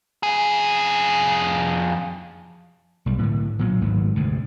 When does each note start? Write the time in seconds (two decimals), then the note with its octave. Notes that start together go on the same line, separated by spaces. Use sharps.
0.23 F2 G#4
3.06 B1 G3
3.18 A2 D3
3.59 A#2 F#3 A#3
3.81 G#1 D2 G#2 F#3
4.16 D2 G#2 C3